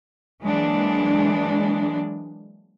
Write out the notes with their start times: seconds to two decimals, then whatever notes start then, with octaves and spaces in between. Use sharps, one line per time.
0.42 E3 F#3 G#3 A#3 D4